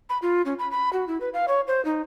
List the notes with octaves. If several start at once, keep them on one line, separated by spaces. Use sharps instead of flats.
B5
F4
C#4
B5
B5
F#4
E4
B4
F5
C#5
C5
D#4